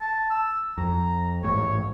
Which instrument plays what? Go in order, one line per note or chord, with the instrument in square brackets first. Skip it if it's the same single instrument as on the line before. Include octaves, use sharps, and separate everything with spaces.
[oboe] A5
E6
[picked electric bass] F2 [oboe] A#5
[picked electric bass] A1 G#2 [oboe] C#5